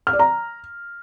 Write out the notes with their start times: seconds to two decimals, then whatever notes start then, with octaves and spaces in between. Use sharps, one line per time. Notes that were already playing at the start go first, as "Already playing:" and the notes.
0.07 F6
0.13 D5
0.19 A#5